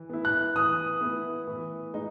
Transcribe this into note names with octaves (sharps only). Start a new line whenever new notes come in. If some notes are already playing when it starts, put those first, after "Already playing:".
Already playing: E3
B3 E4
F#6
E3 D#6
B3 E4
E3
G#3 D#4